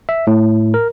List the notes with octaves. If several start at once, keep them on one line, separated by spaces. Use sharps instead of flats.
E5
A2
A#4